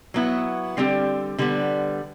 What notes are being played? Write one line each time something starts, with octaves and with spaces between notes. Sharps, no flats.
F#3 B3 E4
D3 G3 C4 G4
D3 G3 B3